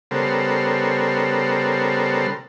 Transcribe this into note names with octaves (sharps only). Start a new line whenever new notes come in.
C#3 G3 B3 A4 A#4 C5